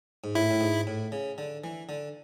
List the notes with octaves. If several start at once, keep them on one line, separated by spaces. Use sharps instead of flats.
G#2
A2 E4
A2
G#2
A2
C#3
D3
E3
D3